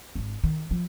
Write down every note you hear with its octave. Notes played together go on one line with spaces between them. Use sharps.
G#1 D4
D#3
F3